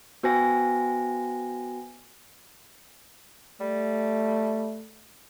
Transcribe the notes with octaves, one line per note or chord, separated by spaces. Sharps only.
B3 F#4 C5 G5 G#5 A#6
G3 A3